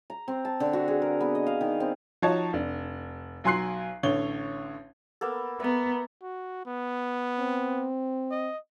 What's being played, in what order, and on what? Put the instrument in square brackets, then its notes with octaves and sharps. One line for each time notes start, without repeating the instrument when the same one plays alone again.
[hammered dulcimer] A#5
C4
A5
D3
F#4
G#4
A#4
B3
D#5
F5
D#3
C4
[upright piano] F3 D#4 F#4 C#5 A5 G#6
F1 D4
B1 F#3 G#5 C6 F#6 C7
A1 D3 C#5 G7
[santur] A#3 B3 A4
[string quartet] B3 [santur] E5 A#5
[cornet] F#4
B3
[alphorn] C4
[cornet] D#5